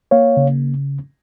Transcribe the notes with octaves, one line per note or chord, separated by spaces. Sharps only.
A#3 C#5 F5
C#3